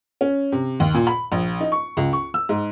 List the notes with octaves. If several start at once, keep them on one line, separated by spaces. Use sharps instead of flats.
C#4
C3
D#2
A#2
B5
A#1
D#4
C#6
C#2
C#6
E6
G#2